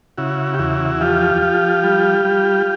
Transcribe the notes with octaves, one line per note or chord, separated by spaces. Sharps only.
C#3 E4 F#4
G4
E2 E4 F#4
F3 F4 G4
F3
G3
G3